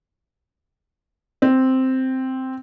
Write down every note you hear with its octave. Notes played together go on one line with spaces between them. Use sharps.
C4